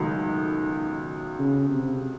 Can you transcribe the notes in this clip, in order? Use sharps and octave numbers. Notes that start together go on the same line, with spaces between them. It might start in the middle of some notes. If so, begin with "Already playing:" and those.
Already playing: C#2 B2 D#3 F#3 A3
C#3
C3